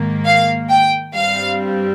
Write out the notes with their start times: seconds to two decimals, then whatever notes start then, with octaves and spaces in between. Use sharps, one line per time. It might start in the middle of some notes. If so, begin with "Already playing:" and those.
Already playing: G#2 D#3 A#3
0.26 F5
0.70 G5
1.14 G2 G3 C4 F5